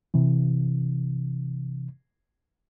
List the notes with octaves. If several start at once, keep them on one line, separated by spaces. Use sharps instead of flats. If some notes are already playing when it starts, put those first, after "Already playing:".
C3 E3